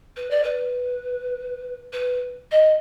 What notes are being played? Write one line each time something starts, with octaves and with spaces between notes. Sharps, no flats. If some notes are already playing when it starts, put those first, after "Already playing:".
B4
D5
B4
B4
D#5